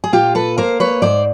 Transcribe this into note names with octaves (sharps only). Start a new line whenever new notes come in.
G#4
A#2 F4 G4
A4 B4
A#3 A#4 C5
B4 C#5
G#2 C5 D5